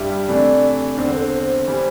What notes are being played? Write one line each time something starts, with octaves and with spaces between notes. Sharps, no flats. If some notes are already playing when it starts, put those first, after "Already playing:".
Already playing: G2 G3 E4 G4
C3 E3 A3 D4 D5
E2 D3 C4 D5
C5
A4
C5
E3 G3